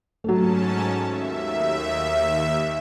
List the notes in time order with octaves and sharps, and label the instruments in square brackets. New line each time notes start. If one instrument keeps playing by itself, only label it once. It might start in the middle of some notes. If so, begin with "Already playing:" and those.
[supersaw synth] G#2 C#4 A5 [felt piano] F#3 A3
[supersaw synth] D#2 E5